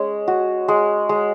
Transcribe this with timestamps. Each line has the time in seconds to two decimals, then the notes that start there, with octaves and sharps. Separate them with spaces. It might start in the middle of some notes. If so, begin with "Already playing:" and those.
Already playing: G#3 C#4
0.28 F#4
0.68 G#3
1.09 G#3